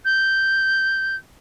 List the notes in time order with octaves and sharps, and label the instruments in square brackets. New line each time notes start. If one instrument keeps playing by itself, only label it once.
[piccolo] G6